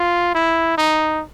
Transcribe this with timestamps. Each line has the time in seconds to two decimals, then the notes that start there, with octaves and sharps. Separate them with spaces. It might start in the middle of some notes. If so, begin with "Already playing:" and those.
Already playing: F4
0.35 E4
0.77 D#4